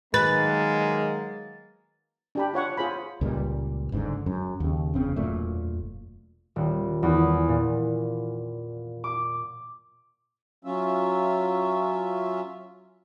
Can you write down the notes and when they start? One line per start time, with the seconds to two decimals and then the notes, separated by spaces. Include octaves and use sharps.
0.14 D#3 F#3 G#3 A#3 B4 A6
2.35 D4 G4 B5
2.54 F4 C#5 F#5 C#6
2.77 F4 G#4 C5 B5
3.21 C#2 A#2 G3
3.92 F#1 G#2 D3
4.26 F#2
4.60 D#2 C#3
4.94 F#1 E2 C#3 C4
5.16 E1 F#2 A#2 A3
6.56 D#1
7.03 E2
7.48 A#2
9.04 D6
10.65 F#3 C#4 F4 E5